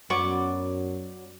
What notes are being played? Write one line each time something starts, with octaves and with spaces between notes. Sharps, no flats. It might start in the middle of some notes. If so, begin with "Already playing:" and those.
F#2 F#3 B3 D5 C#6